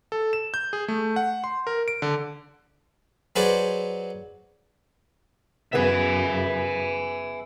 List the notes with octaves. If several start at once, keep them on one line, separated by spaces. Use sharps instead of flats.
A4
E7
G6
G#4
A3
F#5
C6
A#4
D7
D3
F#3 F#4 G#4 B4 C5 D5
F#2 C#3 B3 G#4 B4 E5 G#5